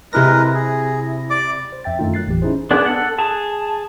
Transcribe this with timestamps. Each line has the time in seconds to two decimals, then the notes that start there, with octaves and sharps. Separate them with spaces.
0.13 C3 G#3 E4 A#4 B4 A#6
0.54 G#4
1.30 D5 D6
1.72 C5
1.84 F2 E5 G5 A6
1.99 F#2 D#3 A3 D4 D#4 F4
2.14 F#3 F#6 A6 C7
2.26 G1 E2 A2 E3 G4
2.42 C#4 D#4 E4 G#4 C5
2.71 B3 D4 G#4 D5 F#5
2.86 A4 F#5
3.19 G#4 A5